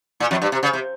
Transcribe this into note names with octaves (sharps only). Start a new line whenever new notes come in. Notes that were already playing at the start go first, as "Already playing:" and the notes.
A#2
F2
G2
C3
C#3
C3